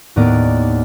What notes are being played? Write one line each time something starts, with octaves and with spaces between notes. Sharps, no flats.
D#2 A2 B3 A#4 D5